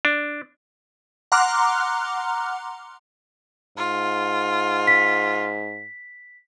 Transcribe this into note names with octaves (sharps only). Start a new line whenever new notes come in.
D4
F#5 A#5 C6 D6 F6 F#6
G#2 F4
B6